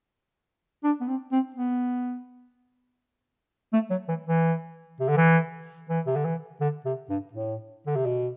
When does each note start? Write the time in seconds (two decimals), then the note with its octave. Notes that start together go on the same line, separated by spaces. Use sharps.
0.84 D4
1.01 B3
1.08 C4
1.32 C4
1.56 B3
3.73 A3
3.90 F#3
4.08 E3
4.26 E3
5.00 C3
5.08 D3
5.17 E3
5.89 E3
6.06 C3
6.15 D3
6.25 E3
6.60 D3
6.85 C3
7.09 G2
7.33 A2
7.86 D3
7.96 C3
8.06 B2